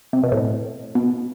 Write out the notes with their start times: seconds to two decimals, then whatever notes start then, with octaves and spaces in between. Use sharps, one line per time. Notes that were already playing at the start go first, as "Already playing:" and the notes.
0.13 C3
0.23 B2
0.32 A2
0.95 B2